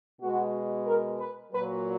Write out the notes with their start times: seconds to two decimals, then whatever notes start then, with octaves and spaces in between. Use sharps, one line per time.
0.21 B2 G#3 F#4
0.86 A#4
1.19 B4
1.52 A#2 F#3 B4